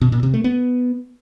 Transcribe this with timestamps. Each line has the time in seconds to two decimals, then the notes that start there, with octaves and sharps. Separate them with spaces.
0.01 B2
0.12 A#2
0.23 C3
0.34 A3
0.44 B3